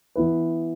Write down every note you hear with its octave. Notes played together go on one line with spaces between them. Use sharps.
E3 B3 E4 B4